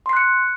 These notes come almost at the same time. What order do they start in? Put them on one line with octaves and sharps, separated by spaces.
C6 C7 F#6 C#7